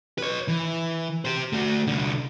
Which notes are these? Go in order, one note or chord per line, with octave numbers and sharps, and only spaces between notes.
B4 C#5
E3
G4 C5
A3 F#4
C2 D3